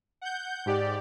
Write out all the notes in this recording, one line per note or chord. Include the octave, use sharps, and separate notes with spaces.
F#5 G6
G#2 G4 D5